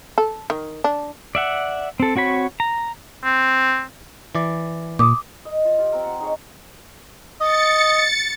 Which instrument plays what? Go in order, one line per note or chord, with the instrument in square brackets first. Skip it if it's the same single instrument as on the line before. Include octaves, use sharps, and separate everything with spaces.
[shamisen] A4
D#3
D4
[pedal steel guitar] D5 E5 F#5
C4 A4
C4 F#4 C#5 B5
A#5
[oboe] C4
[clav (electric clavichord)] E3 D5
[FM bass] A#2 [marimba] D6 D#6
[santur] D#5
F4
F4 G4
C4 A#4
F#5
D#4 G#4 C#5
[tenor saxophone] D#5 [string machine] A6 C#7